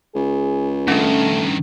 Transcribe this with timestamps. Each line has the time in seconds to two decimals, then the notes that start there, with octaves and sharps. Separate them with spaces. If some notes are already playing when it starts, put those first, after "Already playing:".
0.15 C#2 G#4
0.88 G2 D#3 A3 C#4 D4